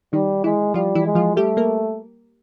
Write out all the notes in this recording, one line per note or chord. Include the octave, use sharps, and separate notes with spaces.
D#3 G3 D#4
E3 G#3 E4
F3 G3 F4
E3 E4
G#3
F3 F4
G3 A3 G4
A#3 A#4